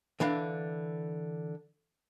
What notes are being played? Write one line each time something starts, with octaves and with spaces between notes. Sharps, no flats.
D3 E3 D4 F5